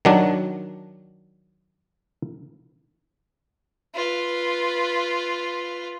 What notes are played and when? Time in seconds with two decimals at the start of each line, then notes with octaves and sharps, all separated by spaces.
0.05 D#3 F#3 D4
3.94 F4 B4